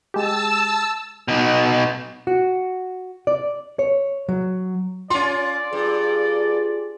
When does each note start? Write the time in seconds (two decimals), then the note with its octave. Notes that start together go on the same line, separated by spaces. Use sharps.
0.14 G#3 G4 A5 E6
1.28 B2 D#4
2.27 F#4
3.27 D5
3.79 C#5
4.29 F#3
5.10 C#4 F4 D5 C6
5.73 G2 F4 G#4